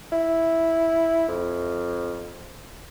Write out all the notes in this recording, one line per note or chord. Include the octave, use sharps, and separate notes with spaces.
E4
F2